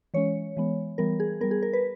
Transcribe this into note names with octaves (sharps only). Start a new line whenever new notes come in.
E3 G#3 C#4 C#5
E3 G#3 B3
E3 G3 B3 A#4
G#4
G3 B3 A#4
G#4
A#4
B4